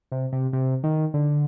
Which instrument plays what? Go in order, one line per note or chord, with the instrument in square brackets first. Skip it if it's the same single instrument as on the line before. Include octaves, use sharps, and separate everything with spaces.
[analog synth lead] C3
C3
C3
D#3
D3